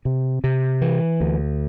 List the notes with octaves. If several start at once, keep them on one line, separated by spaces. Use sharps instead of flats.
C3
C3
E3
D2